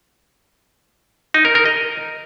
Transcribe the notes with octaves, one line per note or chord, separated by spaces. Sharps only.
D#4
A#4
A#4
D#5